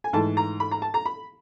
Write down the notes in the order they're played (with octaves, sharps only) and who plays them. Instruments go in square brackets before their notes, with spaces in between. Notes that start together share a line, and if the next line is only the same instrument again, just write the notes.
[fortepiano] G#5
G#2 E3 A3 A5
A#5
B5
A#5
A5
A#5
B5